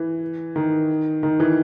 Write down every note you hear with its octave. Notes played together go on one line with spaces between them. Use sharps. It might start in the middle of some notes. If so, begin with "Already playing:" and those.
Already playing: E3
D#3
D#3
E3